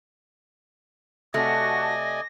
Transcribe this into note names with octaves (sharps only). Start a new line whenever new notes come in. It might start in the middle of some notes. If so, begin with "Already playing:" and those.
C3 A3 F#4 D5 D#5 G#5 A5 A#6